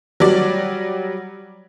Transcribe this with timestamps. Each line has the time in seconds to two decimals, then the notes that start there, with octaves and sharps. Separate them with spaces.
0.20 F#3 G3 D5